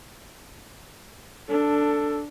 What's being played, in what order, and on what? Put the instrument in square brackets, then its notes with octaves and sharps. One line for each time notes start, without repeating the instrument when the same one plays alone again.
[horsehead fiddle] D4 [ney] A4